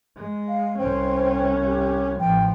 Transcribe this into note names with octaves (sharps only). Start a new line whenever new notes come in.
G#3
F5
C2 C#4 C5 G5
G4
A1 F3 G5